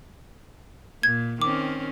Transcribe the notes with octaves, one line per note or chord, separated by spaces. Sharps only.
A#2 G#6
D#3 C4 C#4 D6